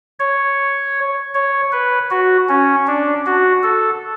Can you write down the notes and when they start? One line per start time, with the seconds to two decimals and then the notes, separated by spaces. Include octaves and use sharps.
0.20 C#5
1.35 C#5
1.72 B4
2.11 F#4
2.49 C#4
2.87 D4
3.26 F#4
3.63 A4